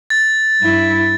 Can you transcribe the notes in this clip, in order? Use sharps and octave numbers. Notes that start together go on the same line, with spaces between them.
A6
G2 E4